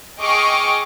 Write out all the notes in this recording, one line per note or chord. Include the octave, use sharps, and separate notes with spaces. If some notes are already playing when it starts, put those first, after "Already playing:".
G#4 D#5 G5 C#6 D6 F6